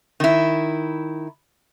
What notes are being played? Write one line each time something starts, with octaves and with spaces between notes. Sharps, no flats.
D#3 E4